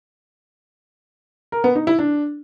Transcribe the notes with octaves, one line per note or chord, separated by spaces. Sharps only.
A#4
B3
D#4
E4
D4